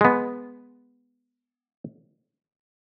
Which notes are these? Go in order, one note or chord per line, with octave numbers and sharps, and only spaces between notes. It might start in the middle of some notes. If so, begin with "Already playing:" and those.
G#3 B3